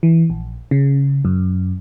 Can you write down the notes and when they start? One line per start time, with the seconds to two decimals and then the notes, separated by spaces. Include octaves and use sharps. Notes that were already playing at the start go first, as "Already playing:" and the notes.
0.03 E3
0.30 A#1
0.71 C#3
1.25 F#2